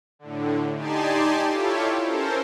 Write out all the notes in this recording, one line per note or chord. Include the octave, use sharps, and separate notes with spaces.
A2 D3
D#4 G4 D5 G#5 A5 C6
E4 F4 G4 A4 C#5
C#4 A4 A#4 C5